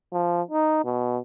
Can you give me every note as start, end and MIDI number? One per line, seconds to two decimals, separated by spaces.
0.13 0.42 53
0.51 0.80 63
0.85 1.19 47